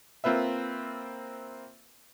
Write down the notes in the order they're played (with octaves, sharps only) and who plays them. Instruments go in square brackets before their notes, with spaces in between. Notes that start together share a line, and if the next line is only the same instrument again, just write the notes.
[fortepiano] A#3 C4 F4 B4 E5